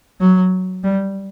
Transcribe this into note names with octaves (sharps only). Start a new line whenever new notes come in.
F#3
G3